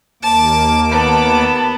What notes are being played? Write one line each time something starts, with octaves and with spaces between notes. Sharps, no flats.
D#2 A#3 A5 D6
B3 A5 B5